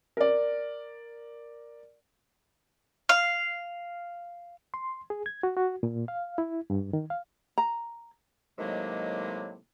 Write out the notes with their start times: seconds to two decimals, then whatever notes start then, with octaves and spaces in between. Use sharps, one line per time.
0.17 A#4 D5
3.09 F5
4.74 C6
5.10 G#4
5.26 G#6
5.43 F#4
5.57 F#4
5.83 A#2
6.08 F5
6.38 E4
6.70 G2
6.93 D#3
7.10 F5
7.58 A#5
8.59 A2 C3 D#3 F#3 G#3 A#3